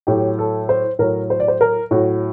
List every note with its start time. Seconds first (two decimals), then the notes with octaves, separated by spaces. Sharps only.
0.07 A2 F#3 G4
0.39 A4
0.69 C5
0.99 A2 F#3 A#4
1.30 C5
1.40 D5
1.48 C5
1.61 A#4
1.91 A2 F#3 F#4